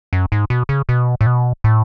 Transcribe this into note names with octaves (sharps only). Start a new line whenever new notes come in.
F#2
G#2
B2
C#3
B2
A2
B2
A2